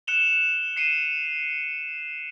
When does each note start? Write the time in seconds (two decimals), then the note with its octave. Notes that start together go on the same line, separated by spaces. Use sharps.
0.07 F#6 C#7 E7 F7 G7
0.76 C7 C#7 D#7 E7